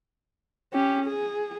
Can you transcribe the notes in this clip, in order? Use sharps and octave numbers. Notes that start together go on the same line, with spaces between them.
C#4 G4
G#4